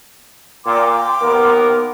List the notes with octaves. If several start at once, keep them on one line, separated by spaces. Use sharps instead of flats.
A#2 G5 C6 D6
D#2 B3 A#4